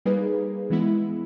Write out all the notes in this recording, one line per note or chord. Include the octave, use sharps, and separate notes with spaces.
G3 A#3 D#4 G#4 B4
E3 G#3 B3 E4